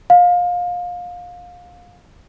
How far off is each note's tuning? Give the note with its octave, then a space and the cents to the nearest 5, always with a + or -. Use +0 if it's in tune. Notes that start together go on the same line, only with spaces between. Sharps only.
F5 +25